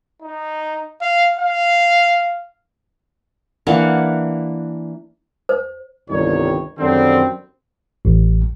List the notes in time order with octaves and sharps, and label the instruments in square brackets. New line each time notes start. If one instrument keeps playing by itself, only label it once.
[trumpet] D#4
F5
F5
[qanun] E3 A#3 D4 F#5
[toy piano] C5
[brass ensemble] G1 C2 D#3 G3 D#4 C#5
F#2 D3 D#3 G3 C4
[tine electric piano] A1